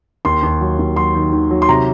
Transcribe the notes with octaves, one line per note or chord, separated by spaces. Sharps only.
D#2 C6
D#2
F#3
D#2
F#3 C6
D#3
D#3
F#3
C6
C3 A#5